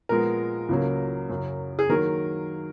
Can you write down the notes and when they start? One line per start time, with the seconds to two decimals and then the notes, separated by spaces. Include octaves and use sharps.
0.09 A#2 F3 G#3 B3 A#4
0.69 C#2 C#3 F#3 A#3
1.29 F#2 C#3 F#3
1.79 G#4
1.89 D#3 F#3 A#3 A#4